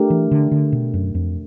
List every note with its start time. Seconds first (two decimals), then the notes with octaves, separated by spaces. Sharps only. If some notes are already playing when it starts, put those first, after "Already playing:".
Already playing: A3 D4 G4 A#4
0.10 E3
0.31 D3
0.52 D3
0.72 B2
0.94 F#2
1.15 F2